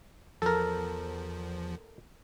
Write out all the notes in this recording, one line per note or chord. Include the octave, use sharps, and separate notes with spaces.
E2 F3 A4 A#4